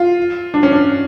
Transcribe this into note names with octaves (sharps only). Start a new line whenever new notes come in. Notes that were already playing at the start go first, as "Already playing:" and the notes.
Already playing: F4
D4
C#4
D4